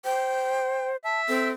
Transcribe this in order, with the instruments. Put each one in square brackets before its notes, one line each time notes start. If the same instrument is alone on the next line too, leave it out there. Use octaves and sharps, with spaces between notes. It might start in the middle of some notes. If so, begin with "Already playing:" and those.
[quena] C5 [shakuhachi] G5
[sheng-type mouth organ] E5 [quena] A5
[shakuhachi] C4 [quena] A4